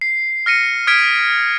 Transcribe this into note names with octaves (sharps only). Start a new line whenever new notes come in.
C7
F6 A#6 C#7 D#7
D#6 F6 G#6 B6 D7